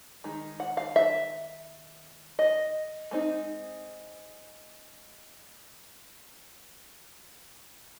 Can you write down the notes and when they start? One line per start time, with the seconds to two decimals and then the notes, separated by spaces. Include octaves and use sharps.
0.24 D#3 G#3
0.60 F#5
0.77 F5
0.96 E5
2.39 D#5
3.11 G#3 C4 D#4